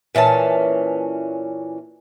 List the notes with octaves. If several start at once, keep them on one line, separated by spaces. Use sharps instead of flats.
A#2 E3 C#4 A5